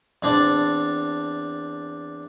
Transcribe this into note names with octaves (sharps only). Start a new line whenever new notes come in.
E2 C4 D4 A5